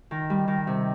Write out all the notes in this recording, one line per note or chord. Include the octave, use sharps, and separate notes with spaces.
D#3
G3
D#3
C3